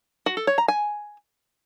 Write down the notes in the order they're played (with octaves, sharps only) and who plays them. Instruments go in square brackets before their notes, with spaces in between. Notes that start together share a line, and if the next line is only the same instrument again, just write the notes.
[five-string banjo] F#4
A4
C#5
A#5
G#5